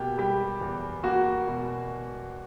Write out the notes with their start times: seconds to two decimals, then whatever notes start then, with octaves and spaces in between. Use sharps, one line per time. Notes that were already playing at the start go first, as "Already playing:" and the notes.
Already playing: B2 A#3 G4
0.18 G3 G4
0.61 E2
1.04 A#3 F#4
1.48 B2